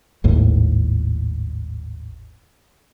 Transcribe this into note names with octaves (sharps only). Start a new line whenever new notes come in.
G#1 D#2 A2